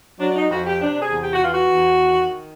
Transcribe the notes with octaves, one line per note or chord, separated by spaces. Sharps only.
F#3 D4
D4
D#4
F2 F#4
G4
C3 D4
G#4
E2
G4
F#4
E3 F4
F#4
E2
D#3